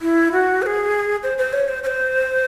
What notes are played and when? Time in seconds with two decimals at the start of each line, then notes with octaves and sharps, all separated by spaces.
0.02 E4
0.32 F#4
0.62 C5
0.66 G#4
1.23 C5
1.38 C5
1.53 C#5
1.68 C5
1.83 C#5
1.87 C5